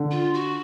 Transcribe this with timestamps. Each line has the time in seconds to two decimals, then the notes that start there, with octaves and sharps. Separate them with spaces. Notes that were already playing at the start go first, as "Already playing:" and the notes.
Already playing: D3
0.11 F4
0.34 F#4